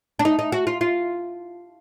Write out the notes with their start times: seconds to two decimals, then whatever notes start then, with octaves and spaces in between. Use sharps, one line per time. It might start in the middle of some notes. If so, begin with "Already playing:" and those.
0.19 D4
0.25 D#4
0.39 D#4
0.52 F#4
0.67 F4
0.81 F4